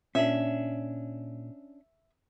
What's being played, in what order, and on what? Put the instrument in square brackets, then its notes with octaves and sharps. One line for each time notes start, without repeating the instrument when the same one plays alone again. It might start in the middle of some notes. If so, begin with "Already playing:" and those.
[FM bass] A#2 [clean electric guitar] C#4 D4 [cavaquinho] E5